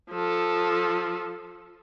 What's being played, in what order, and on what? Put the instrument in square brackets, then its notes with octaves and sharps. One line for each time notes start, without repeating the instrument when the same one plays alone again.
[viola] F3 A4